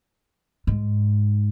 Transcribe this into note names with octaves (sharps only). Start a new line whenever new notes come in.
G#2